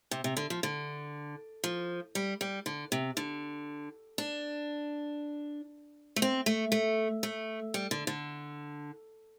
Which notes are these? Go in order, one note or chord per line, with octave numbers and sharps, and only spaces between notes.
C3
C3
D3
F3
D3
F3
G3
G3
D3
C3
D3
D4
A3
C4
A3
A3
A3
G3
D3
D3